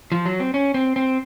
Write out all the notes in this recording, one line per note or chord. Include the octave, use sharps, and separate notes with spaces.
F3
F#3
C4
C#4
C4
C4